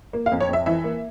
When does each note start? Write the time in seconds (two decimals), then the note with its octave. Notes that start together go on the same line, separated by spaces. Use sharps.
0.13 A#3
0.26 F5
0.32 F2
0.40 C#5
0.49 F2 E5
0.66 E3 E5
0.84 A#3